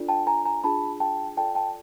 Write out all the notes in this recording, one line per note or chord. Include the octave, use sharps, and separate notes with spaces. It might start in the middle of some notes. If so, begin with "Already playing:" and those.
Already playing: D4 F4 A4 D5
G5 A5
G#5 A#5
G#5 A#5
D4 F4 G#4 A5 B5
G5 A5
F4 A4 D5 G5 A5
G5 A5